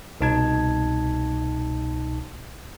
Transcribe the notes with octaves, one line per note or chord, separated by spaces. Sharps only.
C2 B2 D#4 A5 G#6